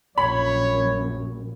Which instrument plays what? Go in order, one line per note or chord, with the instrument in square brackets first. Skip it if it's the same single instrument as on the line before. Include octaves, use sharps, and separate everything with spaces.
[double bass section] A#1 F#2 [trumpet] C#5 [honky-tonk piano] B5